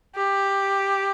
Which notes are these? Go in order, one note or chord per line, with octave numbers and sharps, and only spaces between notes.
G4